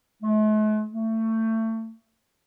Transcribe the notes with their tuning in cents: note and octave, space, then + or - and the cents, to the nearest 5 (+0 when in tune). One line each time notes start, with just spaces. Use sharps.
A3 -45
A3 +25